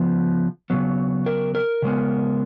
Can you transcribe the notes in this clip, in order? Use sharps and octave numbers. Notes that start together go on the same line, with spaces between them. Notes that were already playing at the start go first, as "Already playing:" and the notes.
Already playing: C#3 F3 B3
C#3 F#3 B3
A#4
A#4
C#3 G#3 B3